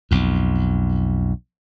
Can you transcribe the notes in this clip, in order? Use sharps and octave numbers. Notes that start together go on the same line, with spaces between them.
B1 F2